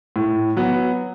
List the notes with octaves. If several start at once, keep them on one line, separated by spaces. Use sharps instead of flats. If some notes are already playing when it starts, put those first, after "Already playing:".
A2
F#3 B3